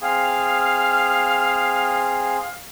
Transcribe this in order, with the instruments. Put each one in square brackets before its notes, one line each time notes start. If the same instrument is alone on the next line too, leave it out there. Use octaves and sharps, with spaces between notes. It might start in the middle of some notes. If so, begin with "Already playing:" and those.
[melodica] C4 G#4 [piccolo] F5